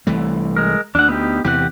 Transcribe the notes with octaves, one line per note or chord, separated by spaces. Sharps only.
C2 E3 A3
G#3 A#4
D2 D4 F#5
B3 D#4 G4
E2 C3 E3 G4 F#5